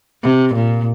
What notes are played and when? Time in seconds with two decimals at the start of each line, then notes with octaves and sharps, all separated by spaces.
0.23 C3
0.54 A#2